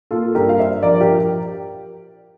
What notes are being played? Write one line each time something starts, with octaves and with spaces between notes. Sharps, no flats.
A#3 F4 A4
G2 G4 A#4
F5
D4 C5 E5
F3 A#4 D5
G4 A#4